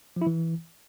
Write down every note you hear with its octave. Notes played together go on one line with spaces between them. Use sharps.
F3
E4
E3